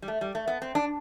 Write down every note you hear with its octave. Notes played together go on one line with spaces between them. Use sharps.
G3
A3
G3
A3
B3
C4
D4